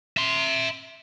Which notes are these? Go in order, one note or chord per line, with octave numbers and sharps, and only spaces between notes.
E5 C6